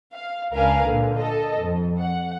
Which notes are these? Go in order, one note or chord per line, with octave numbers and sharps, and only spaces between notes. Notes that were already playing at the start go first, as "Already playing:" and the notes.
F5
C#2 D4 A#4 B4 F5 G#5
A#2 D3
A4 D#5
F2
F#5